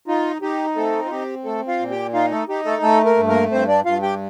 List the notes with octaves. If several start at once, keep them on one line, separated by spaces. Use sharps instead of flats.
D#4 F4
D#4 G4
A3 C4 A4
F4
C4 G4
A3 A4
F4 F5
A#2
G4 G5
D#4 F4 F5
A3 A4
D#4 G4
A3 A4
A3 A4
A#3 A#4
G2
A#3 A#4
G2 C4 C5
D4 D5
G2 F4 F5
G4 G5